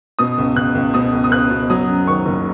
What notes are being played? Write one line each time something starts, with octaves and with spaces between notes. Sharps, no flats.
B2 D#6
C#2
C#2 F#6
C#2
B2 D#6
C#2
D#6
C#2 F#6
B2
F#3 D#6
F#2
D#3 C#6
F#1